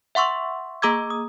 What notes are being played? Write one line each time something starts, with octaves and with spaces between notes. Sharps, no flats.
E5 F#5 C6 C#6 E6
A#3 G#4 A#5 D6 E6 G#6
D#6